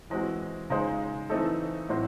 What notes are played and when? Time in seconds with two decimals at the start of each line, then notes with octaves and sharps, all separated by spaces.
0.10 E3 G#3 C4 F#4
0.70 C#3 G#3 D#4 G#4 C5
1.30 E3 A3 C4 D#4 A4
1.89 A2 F#3 C4 F#4 C5